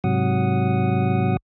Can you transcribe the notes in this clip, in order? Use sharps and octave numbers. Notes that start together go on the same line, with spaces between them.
G#2 C3 F#3 F#5 D#6